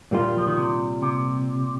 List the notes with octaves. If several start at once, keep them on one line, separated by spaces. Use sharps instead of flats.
A#2 G3 A#3 F4
F3
D#3
C3
C3